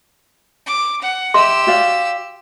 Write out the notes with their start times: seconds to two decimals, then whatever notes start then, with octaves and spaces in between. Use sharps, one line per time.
0.66 D6
1.02 F#5
1.34 G4 D#5 E5 C6 E6
1.67 F#4 D5 F5